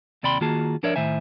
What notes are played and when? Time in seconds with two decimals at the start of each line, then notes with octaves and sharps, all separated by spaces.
0.23 D#2 C3 D5 G5 B5 C6
0.41 D#3 A#3 F4 F#4 G#4 A5
0.83 F3 D4 A#4 C#5 D5 E5
0.96 A2 D#3 C5 E5 G#5